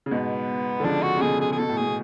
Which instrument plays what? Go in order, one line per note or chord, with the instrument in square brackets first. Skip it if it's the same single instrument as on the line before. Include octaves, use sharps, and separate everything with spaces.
[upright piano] C#3
[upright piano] G#2 B2 [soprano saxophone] B3
[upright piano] D3
[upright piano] C#3 F3 [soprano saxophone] D4
[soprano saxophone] F#4
[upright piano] C#3
[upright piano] B2 D3 [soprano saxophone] G#4
[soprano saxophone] G#4
G#4
[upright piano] B2 [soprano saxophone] A4
[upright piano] A2
[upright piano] B2 [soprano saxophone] G#4